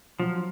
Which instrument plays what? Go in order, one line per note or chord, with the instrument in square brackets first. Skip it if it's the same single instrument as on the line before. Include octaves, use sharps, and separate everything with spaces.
[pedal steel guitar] F3 [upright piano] F#3